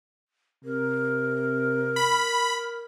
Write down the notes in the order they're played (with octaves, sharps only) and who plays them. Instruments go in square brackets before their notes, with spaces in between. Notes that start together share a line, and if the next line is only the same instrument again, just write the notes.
[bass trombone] C3 [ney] A#4
[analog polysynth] B5